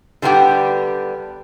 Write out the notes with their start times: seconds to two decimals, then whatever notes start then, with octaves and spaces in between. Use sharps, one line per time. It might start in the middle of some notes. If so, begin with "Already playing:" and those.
0.22 D3 G3 B3 E4 G4